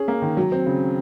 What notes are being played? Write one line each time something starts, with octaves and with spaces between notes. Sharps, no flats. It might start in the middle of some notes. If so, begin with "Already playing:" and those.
Already playing: C#4 G#4
A#3
D#3
F#3
C4
C#3